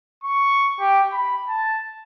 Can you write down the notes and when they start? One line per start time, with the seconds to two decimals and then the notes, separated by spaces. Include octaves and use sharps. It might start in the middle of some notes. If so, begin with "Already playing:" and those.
0.24 C#6
0.80 G4
1.12 B5
1.49 A5